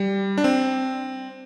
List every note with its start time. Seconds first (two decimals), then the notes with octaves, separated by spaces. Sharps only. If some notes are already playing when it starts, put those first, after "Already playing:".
Already playing: G3
0.38 D4
0.44 C4